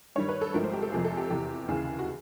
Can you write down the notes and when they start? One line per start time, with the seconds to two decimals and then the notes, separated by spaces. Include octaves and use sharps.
0.16 G2 D#3 G3 C#5
0.29 B4
0.41 A4
0.54 G#1 G#2 F3 A3 A#4
0.64 C5
0.73 G4
0.82 A4
0.92 F2 C3 F3 A#3 G#4
1.05 A4
1.17 G4
1.30 E2 C3 E3 G4
1.68 D#2 C#3 E3 G#4
1.99 F#4